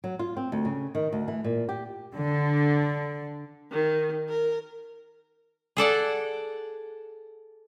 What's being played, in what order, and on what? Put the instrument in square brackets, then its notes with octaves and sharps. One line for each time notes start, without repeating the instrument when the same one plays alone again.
[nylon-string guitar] F#3
F4
C4
D2
C#3
D#3
D2
E3
A#2
G4
[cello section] D3
[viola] D#3
A#4
[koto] G#4 A4 D5 F#5